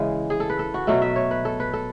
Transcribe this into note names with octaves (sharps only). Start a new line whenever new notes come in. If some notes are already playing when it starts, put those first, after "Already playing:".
Already playing: C#3 E3 G#3
G#4
A4
B4
A4
F#4
B2 F#3 A3 A4
E5
C#5
B4
A4
B4
A4